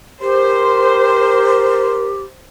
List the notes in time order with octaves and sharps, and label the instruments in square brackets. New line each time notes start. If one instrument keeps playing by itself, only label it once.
[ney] G4 [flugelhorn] A#4 [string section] C5